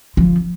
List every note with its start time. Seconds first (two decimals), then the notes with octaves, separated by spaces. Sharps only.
0.17 F3